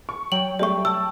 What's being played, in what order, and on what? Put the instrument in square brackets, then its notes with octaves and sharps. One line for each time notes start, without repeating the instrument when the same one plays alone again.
[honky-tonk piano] C#6
[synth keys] F#3 G5 [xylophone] F#7
[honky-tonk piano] G3 A3 [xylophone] D5 C#6
[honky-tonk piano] A5 [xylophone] E6